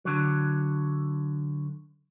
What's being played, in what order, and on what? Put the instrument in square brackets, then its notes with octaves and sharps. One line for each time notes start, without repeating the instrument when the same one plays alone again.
[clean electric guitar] D3 F#3